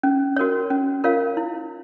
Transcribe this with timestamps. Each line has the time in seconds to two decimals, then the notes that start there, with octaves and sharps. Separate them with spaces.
0.03 C#4
0.36 F#4 A#4 C#5
0.70 C#4
1.04 F4 A#4 C#5 F5
1.37 E4